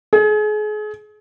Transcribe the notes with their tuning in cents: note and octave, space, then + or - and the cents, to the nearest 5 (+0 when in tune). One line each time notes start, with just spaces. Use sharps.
G#4 +35